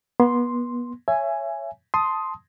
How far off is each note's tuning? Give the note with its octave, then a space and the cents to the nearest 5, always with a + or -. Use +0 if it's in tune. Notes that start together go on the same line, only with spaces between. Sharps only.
B3 -30 C6 +0
C#5 +0 E5 +25 G#5 +0
A5 +0 C6 +0 D#6 +10